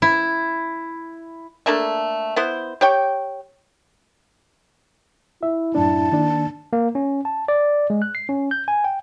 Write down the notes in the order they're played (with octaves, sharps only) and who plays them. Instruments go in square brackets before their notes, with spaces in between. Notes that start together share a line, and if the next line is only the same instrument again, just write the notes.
[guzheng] E4
[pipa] A3 A#3 D4 A4
B3 E4 C5
G4 C#5 G5
[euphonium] E4 [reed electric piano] E5
[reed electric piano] F#2 A2 D4 [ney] A5
[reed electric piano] D#3 A#3 D4
[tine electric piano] A#3
C#4
A5
D5
G#3
F#6
C7
C#4
G6
G#5
G5